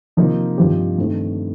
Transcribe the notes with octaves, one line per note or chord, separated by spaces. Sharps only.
C3 F3 A#3 D#4
G2 F3 C4 D#4 G4
G2 D#3 A3 C4 D#4